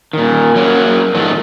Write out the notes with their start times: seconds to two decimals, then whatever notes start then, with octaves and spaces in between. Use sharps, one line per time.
0.13 A#2 D#3
0.56 F#3 A#3 C#4
1.15 G#2 D#3 F3 F#3 A3